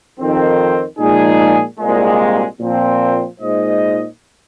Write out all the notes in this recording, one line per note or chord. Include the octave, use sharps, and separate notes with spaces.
F2 D#3 C4
A#2 F3 G#3 D#4 G#4
C2 A#2 G#3
A#2 F3 C4
A#2 G#3 D#4 C5 D#5